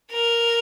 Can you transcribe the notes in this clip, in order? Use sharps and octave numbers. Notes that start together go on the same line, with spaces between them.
A#4